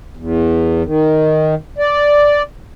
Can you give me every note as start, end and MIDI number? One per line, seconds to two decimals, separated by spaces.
0.17 0.83 40
0.85 1.55 51
1.78 2.42 74